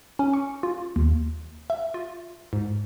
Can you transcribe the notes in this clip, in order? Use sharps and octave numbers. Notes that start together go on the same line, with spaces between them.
C#4
C#6
F4
D#2
E5
F4
G#2